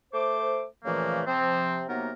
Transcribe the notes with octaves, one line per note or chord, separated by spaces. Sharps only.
A3 C5 D6
A#2 C#3 E3 F3 A3 A#3
C3 F3 C4
C3 F#3 A#3 B3 D#4 A#4